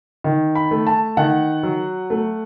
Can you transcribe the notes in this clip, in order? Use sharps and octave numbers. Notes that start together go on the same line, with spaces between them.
D#3
B5
A3
A5
D#3 F#5
F#3
A3